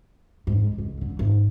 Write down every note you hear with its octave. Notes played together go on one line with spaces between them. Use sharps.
G#2
C#2
D3
G#1